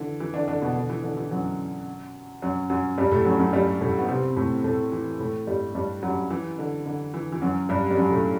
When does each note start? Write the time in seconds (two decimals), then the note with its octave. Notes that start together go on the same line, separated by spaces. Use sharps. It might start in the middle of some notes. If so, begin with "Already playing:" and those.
Already playing: D3 E3
0.20 E3
0.34 D3 D4
0.48 D3 D4
0.62 B2 B3
0.75 D3
0.90 E3
1.04 D3
1.17 E3
1.31 F#2 F#3
2.42 F#2 F#3
2.70 F#2 F#3
2.98 G2 G3
3.12 A2 A3
3.25 F#2 F#3
3.39 F#2 F#3
3.53 G2 G3
3.81 A2 A3
3.99 B3
4.08 C3 C4
4.36 A2 A3
4.64 A2 A3
4.92 E3
5.20 A2 A3
5.47 G2 G3
5.75 G2 G3
6.03 F#2 F#3
6.30 E3
6.59 D3
6.86 D3
7.14 E3
7.32 E3
7.42 F#2 F#3
7.69 G2 G3
7.91 G3
7.97 F#2 F#3
8.11 A2 A3